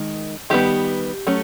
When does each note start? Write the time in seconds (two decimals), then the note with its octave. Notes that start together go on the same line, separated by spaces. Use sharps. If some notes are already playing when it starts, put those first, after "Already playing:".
Already playing: D#3 G#3
0.50 D#3 G3 B3 G4
1.27 F#3 A3 C#4